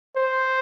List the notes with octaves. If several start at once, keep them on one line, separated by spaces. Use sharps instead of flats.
C5